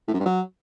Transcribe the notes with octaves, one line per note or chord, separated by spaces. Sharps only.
A2
F#2
G2
F#3